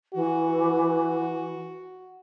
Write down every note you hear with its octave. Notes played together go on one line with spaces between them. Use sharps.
E3 F#4